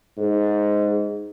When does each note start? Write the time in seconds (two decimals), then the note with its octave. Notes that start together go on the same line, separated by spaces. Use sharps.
0.17 G#2